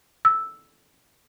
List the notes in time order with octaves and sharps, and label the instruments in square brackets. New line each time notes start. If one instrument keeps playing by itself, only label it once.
[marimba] E6